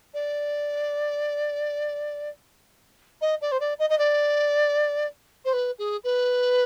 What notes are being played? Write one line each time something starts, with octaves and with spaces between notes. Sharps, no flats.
D5
D#5
D5
C5
D5
D#5
D#5
D5
C5
B4
G#4
B4